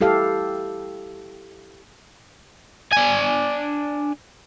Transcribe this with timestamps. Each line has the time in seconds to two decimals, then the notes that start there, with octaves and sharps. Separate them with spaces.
0.01 E4 G4 A4 F5
2.93 D4 G#5